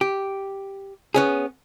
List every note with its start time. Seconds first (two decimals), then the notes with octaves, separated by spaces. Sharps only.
0.01 G4
1.14 B3 C#4 G#4